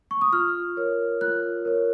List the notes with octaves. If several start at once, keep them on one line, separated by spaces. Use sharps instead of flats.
C#6
D#6
F4 F6
A#4 C#5
F4 F#6
A#4 C#5